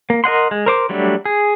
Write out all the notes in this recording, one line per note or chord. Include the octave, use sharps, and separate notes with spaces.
A#3
A#4 D#5 F#5 C6
G#3
A#4 C5 D6
F#3 G3 A3 D4
G#4